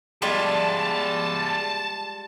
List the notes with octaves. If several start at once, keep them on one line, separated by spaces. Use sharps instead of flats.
G3 G#3 F4 G#4 D5 A5